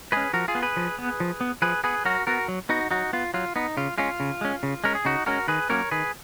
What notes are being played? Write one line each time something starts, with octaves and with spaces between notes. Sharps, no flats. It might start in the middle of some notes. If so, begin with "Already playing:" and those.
G#3 C#4 G#4 B4
F3 F#4 A#4
F4 G#4
B3
G#4 B4
F3
B3
F3
B3
F3 G#4 B4
B3 G#4 B4
F#3 F#4 A#4
B3 F#4 A#4
F#3
B3 D#4 F#4
F#3 D#4 F#4
B3 F4
F#3 F4
B3 D#4
C#3 F4
G#3 C#4 F4
C#3
G#3 C#4
C#3
G#3 C#4 A#4
G#4
C#3 D#4 F#4
G#3 C#4 F#4 A#4
D#3 G#4 B4
F#3 A#3 C#4 A#4 C#5
D#3 G#4 B4